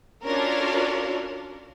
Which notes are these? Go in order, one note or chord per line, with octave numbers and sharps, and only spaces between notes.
C#4 D4 F4 F#4 A4 A#4